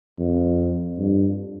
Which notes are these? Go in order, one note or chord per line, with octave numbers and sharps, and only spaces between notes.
F2
G2